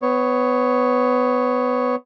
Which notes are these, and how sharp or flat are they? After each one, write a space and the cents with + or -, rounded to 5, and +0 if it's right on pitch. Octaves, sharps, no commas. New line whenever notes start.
B3 +20 C#5 +0